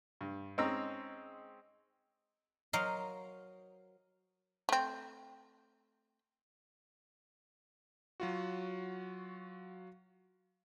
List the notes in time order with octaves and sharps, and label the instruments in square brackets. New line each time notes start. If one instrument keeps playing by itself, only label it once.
[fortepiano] G2
G#3 C4 C#4 D#4 A#5 E6
[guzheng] F#3 A#4 C5 D#5 F5
[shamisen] A3 C4
[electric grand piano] F#3 F4 F#4